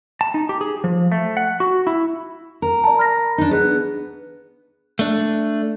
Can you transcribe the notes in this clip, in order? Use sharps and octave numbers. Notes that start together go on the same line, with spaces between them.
A5
D#4
G4
G#4
F3
A3
F#5
F#4
E4
A#4
D5 A5
B5 F6 A#6
D4 D#4
B3 G#4 F#6
A3 D4